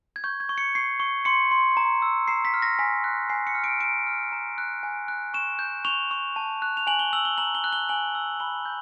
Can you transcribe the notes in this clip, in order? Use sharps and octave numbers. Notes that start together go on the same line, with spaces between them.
G#6
C#6 G6
G#6
C#6
C#7
C#6 C7
C#6
C6 C#7
C6
A#5
E6
A#5 C7
B6
F6
A#6
G#5 B6
F#6
G#5 C7
C#7
F6
D7
A#5 D7
F6
A#5
F#6
G#5
F#6
C#6 E7
G6
C#6 F7
C#6
A5
F#6
F7
G#5 F#7
G7
E6 F#7
G7
A#5 F#7
G7
F#6
G7
G#5 F#7
E6
B5 G7
G6